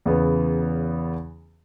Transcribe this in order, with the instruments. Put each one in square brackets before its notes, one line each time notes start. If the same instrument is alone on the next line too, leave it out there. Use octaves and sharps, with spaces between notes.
[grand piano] E2 C#3 B3